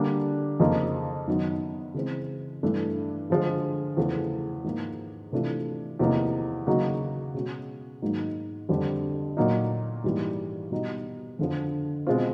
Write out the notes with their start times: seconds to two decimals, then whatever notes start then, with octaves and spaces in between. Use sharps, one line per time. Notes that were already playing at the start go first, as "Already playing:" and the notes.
Already playing: D3 G3 A#3 D4
0.60 F2 C#3 F3 A#3 D#4
1.28 F#2 D#3 F#3 B3 D#4
1.94 C#3 E3 G#3 C4
2.63 G2 E3 A3 D4
3.30 D3 F3 G#3
3.97 E2 C#3 F3 A3
4.64 G#2 F3 A#3
5.32 C3 E3 A3 D4 F4
5.99 E2 C3 F3 A#3 D#4
6.67 C#3 F#3 A#3 D#4 F#4
7.34 B2 G#3 C#4 F#4
8.02 G#2 D#3 F#3 A#3 D#4
8.69 F2 D3 G3 C4
9.37 A#2 F#3 A#3 D#4
10.04 G#2 E3 G3 A#3
10.71 B2 G3 B3 D#4 F#4
11.39 F2 D3 F3
12.07 B2 G#3 C4 F4